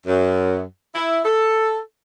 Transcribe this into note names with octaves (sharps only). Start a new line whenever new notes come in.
F#2
E4
A4